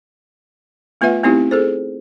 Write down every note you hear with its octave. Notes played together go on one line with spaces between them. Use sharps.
A3 B3 F4 B4 E5 F#5
A3 B3 C4 D#4 E4 G4
G#4 A4 C5